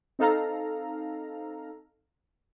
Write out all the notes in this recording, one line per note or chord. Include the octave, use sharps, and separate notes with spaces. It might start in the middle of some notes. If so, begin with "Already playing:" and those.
C4 D#4 A4 F5 A#5